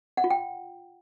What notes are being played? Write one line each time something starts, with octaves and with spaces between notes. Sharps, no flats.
F#5
F4
G5